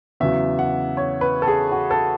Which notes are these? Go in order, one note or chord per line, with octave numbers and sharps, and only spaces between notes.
E2 C#3 F#3 E5
F#5
C#5
B4
A4
G#4
F#4
A4